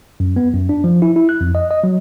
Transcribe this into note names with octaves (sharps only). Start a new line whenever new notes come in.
F#2
B3
F#2
D4
F3
E4
E4
F#6
F2
D#5
D#5
F#3